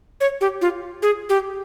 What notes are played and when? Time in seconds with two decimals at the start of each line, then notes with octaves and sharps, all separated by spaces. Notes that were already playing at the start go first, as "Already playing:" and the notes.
0.21 C#5
0.41 G4
0.61 F4
1.02 G#4
1.29 G4